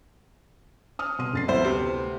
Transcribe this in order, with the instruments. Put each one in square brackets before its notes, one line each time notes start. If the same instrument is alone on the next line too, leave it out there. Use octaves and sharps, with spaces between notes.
[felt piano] D#6 F6
B2 C6 D#7
F1 A6 C7
[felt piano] D2 B3 [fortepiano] E4 C5
[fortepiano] C3